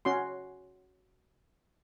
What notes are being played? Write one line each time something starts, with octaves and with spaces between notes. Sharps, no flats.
C#4 F#4 C6